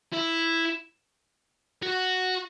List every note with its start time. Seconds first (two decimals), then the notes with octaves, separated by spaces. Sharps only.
0.13 E4
1.82 F#4